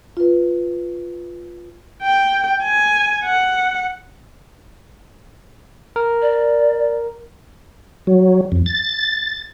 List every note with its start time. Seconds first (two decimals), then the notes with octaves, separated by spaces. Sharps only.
0.17 F4 B4
2.03 G5
2.64 G#5
3.25 F#5
5.96 A#4
6.22 D5
8.07 F#3
8.52 F2
8.66 A6